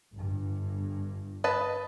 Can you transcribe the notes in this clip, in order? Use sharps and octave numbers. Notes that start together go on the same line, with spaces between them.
G1 G2
B4 D#5 A5